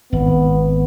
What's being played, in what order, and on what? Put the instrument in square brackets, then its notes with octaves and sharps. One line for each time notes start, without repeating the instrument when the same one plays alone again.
[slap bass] G#1 [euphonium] B3